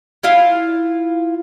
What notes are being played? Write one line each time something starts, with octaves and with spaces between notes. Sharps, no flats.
E4 F4 F5